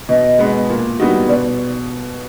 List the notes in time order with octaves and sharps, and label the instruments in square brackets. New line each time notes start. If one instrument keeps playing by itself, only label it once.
[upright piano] B2 [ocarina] D#5
[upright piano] G#3 B3
A#2
G3 B3 D#4 F#4
[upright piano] B2 [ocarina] D5